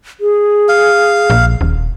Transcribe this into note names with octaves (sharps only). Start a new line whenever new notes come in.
G#4
F5
A#1
D#1